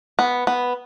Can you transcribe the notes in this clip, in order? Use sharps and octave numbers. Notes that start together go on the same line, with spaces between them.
B3
B3